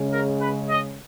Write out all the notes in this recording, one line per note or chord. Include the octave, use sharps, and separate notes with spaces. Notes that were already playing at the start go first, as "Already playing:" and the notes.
Already playing: C#3 G#3 C#4
A#4
B4
D#5